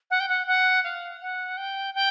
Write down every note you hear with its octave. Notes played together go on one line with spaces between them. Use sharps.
F#5
G5
F#5
F#5
F5
F#5
G5
G5